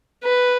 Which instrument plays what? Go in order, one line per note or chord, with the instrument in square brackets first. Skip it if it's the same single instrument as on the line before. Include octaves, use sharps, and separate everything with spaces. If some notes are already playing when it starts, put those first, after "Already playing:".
[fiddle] B4